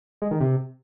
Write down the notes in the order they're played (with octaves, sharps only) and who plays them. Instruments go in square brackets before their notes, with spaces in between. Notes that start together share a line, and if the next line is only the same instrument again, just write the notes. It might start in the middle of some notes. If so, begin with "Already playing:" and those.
[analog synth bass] G#3
D#3
C3